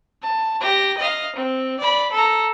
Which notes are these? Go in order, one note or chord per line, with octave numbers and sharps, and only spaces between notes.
A5
G4 A#6
D#5 F5
C4
D5 B5
A4 A#5